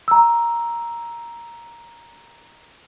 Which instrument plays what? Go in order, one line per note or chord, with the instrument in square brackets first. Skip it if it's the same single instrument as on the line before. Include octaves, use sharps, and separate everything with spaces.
[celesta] A#5 E6